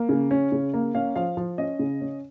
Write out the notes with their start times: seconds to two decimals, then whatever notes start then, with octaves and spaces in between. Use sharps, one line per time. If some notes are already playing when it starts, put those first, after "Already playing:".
Already playing: A#3
0.09 C#3
0.31 C#4
0.52 C#3
0.73 A#3
0.95 C#4 F5
1.16 F3 F5
1.37 F3
1.58 C#4 D#5
1.79 C#3
2.01 C#4